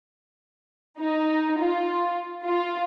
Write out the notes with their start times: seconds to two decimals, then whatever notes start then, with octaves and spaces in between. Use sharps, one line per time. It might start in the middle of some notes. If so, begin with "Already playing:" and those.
0.99 D#4
1.59 F4
2.46 F4